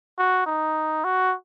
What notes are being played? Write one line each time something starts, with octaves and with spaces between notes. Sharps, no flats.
F#4
D#4
F#4